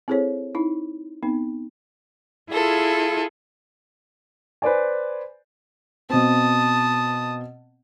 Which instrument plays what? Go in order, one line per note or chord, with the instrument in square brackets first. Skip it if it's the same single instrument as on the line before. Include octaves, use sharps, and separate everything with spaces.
[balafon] C4 E4 G#4 A4 C5 C#5
D#4 E4
B3 C4 D#4
[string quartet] E4 F4 G#4 A4
[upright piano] B4 C5 D5 G#5
[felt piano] B2 C4 [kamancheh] A5 D#6